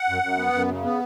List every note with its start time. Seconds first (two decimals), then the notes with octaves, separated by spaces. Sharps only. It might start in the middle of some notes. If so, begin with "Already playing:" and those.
Already playing: F#5
0.08 F#2
0.23 F#2
0.38 B3
0.53 F#2
0.68 C#3
0.84 B3